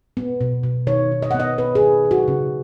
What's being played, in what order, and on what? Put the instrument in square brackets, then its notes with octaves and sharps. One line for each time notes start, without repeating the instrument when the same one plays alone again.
[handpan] B3
B2
B2
D#3 C#5
D#3
D#5
F#5
B3
D#5
B3 B4
G#4
D#3
D#3
F#4
C#3